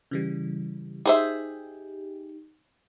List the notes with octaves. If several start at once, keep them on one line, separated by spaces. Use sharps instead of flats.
C#3 E3 G3
D#4 G4 G#4 C5 E5